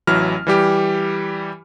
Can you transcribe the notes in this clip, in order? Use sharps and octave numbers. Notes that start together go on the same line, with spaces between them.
A1 E3 F#3 E4 F6
E3 G3 G4